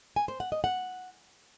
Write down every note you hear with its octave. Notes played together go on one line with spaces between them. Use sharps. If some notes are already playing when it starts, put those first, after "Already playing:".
G#5
C5
F#5
D#5
F#5